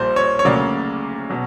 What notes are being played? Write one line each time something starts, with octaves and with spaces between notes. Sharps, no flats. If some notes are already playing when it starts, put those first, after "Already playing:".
Already playing: A#1 A#2 G3 A#3 C5
C#5
C#5
D2 C#3 F#3 A#3 D5
B2 F#3